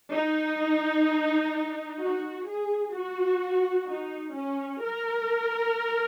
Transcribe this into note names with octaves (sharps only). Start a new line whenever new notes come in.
D#4
F#4
G#4
F#4
D#4
C#4
A#4